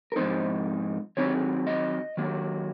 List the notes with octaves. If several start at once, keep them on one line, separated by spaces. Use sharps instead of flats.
A#4
G#2 F3 C4 D#4 C5
D#3 F#3 C4 D#4 C#5
D#5
D#3 F#3 A#3